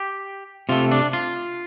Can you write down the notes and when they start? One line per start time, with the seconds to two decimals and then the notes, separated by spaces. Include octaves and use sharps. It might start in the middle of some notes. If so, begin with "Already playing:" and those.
Already playing: G4
0.69 C3 A3 F4
0.91 D4
1.13 F4